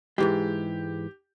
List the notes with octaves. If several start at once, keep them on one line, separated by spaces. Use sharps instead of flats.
G#2 E3 G#3 G4